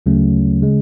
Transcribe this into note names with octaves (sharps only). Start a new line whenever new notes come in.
D2 C#3 F#3 A3 C#4
C#3 G#3